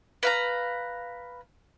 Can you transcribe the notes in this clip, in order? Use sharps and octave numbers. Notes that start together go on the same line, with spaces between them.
B4 F5 A#5